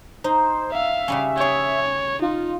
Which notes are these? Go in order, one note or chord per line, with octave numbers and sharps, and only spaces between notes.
D#4 C5
E5 F5
C#3 G3 C#4
G#4 C#5 G5
D#4 F4